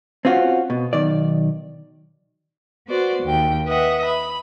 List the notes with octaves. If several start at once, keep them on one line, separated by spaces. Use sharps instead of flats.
C4 C#4 F4 F#4
B2
B1 D#3 D5
B3 F#4 C5 D5
D#2 G5
B4 D#5 E5 F#5
B5